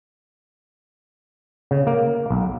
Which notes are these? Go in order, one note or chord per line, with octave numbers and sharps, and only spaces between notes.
C#3
A#3
B1